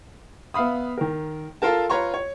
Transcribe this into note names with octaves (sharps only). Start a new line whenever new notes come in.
B3 E5 F5 B5 D#6
D#3 A#4
F4 A4 A#4 A5
F4 B4 C#5 A#5 C6 C#6
C#5